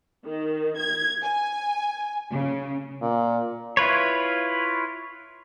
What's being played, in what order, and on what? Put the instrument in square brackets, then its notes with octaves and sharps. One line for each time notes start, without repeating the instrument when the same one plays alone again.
[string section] D#3
G#6
G#5
C#3
[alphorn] A#2
[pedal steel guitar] E4 F4 B4 C#5